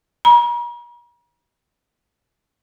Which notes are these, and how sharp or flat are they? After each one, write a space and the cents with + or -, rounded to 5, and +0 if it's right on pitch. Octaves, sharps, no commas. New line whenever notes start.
A#5 +45